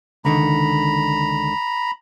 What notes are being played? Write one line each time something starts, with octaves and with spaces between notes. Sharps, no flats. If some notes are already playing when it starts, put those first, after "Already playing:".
C#2 D3 D#3 A#5 B5